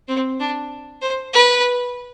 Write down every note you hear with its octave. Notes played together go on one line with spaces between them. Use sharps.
C4
D4
C5
B4